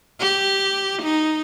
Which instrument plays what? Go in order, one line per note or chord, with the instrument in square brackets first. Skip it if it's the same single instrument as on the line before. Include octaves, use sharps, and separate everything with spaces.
[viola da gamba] G4
D#4